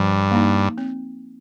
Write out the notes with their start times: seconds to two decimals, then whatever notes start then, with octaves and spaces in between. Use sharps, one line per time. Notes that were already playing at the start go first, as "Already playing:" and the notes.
Already playing: G2 F3
0.31 A#3 D#4
0.78 C4